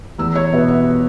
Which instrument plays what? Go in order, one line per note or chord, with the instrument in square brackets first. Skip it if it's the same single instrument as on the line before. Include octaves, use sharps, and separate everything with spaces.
[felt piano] E2 E6
C#5
B2 B3 E5
E5